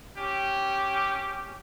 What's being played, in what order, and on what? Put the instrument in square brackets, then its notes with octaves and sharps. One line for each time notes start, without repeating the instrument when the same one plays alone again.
[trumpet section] C#4 G4